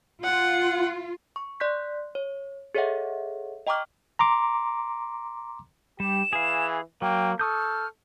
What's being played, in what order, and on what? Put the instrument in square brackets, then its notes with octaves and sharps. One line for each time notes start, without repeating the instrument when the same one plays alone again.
[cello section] F4 [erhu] F#5
[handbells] C#6
D5 C6 F#6 G6 B6
C#5
G#4 A4 C#5 D#5 E5 F#5
D#5 G5 A#5 C#6 D6 F6
[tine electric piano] A#5 C6 D6
[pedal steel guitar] G3 [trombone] G4 [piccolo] E7
[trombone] E3 [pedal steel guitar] G#4 F5
[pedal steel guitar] F#3 [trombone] A#3 [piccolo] G5
[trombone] A4 [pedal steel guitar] C#6 D#6 G6 [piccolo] F6